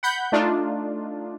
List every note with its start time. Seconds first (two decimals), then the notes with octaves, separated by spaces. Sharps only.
0.03 F#5 B5 G6
0.32 A3 D4 D#4 F4